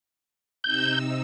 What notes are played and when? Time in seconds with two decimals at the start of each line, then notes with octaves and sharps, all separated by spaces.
0.64 C3 D#4 E6 G6